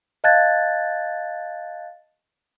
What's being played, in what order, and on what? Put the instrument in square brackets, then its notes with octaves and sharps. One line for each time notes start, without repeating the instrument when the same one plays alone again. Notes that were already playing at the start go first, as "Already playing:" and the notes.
[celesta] D#5 F5 A5 F#6 G#6 A6